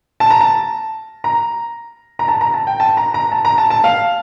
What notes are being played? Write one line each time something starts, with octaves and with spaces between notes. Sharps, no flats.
A5
A#5
A5
A#5
A#5
A5
A#5
A5
G5
A5
A#5
A#5
A5
A#5
A5
A5
F5